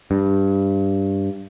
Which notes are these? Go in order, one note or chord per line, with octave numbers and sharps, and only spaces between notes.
G2